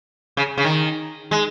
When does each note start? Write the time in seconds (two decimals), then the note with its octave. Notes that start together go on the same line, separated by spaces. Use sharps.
0.37 C#3
0.58 C#3
0.65 D#3
1.31 G#3